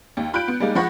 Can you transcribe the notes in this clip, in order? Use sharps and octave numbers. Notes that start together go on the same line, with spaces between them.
D#2
F4 B5 F#6 G6 D7
B3
G3 G#3 A#3 D#4
F3 G#3 F#5 B5 C#6 A#6